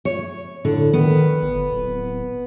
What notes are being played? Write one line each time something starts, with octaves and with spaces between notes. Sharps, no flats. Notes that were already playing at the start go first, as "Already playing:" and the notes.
C#5
A2 D3
D#3 B3
G1
D1